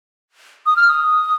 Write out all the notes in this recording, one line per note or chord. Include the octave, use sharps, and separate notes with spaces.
D#6
F6
D#6